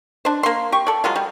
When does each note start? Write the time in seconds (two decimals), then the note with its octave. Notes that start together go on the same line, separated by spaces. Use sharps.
0.25 D4 C5
0.43 A#3 C6
0.72 G4 C#6
0.87 A4 D5
1.04 F#3 G#3 F4
1.16 G3